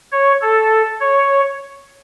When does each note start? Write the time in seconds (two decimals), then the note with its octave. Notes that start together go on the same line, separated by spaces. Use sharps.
0.12 C#5
0.42 A4
1.00 C#5